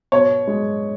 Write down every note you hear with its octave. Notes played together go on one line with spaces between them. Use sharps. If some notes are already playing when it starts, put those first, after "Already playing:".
B2 C#5
G#3